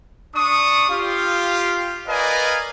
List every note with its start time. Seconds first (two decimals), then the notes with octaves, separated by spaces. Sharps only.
0.35 D4 C#6 D#6
0.90 F4 G4 F5
2.07 A#4 B4 D5 D#5 F5 G#5